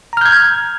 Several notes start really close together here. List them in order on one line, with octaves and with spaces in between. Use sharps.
A#5 F6 G6 G#6